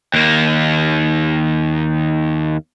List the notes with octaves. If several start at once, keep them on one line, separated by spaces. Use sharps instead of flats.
D#2 A#3